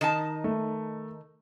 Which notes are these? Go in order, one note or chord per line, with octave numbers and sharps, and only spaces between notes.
D#3 D#4 A5
A3